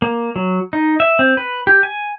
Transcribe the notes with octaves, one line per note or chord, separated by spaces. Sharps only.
A#3
F#3
D#4
E5
C4
B4
G4
G#5